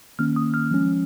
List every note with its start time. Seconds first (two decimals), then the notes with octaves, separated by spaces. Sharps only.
0.19 D#3 A#3 C#4 F6
0.36 D#6
0.54 F6
0.71 F3 G#3 C#4